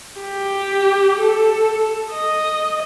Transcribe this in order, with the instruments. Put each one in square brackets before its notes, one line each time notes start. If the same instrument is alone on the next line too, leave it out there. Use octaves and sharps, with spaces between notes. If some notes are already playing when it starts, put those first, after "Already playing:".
[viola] G4
A4
D#5